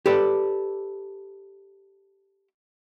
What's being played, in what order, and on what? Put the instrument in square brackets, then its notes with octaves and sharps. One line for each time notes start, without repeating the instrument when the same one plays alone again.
[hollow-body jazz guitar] G4 A4 B4 D5